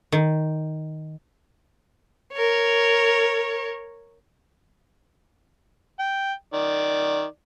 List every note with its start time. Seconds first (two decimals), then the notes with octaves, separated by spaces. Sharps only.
0.12 D#3
2.33 A#4 C#5
5.99 G5
6.54 D#3 D5